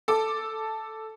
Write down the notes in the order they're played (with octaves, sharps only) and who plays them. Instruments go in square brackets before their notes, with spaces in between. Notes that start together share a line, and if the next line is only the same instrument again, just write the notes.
[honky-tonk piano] A4 D6